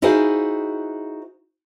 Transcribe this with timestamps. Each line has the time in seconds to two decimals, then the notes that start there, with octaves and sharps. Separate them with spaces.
0.02 D#4 E4 F#4 G#4 C5 F5